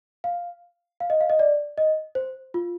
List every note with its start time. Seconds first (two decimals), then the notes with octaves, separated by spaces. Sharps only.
0.24 F5
1.00 F5
1.10 D#5
1.21 F5
1.30 D#5
1.39 D5
1.78 D#5
2.15 C5
2.54 F4